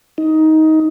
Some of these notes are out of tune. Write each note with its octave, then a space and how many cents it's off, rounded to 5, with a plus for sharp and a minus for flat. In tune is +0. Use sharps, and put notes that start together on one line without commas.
D#4 +15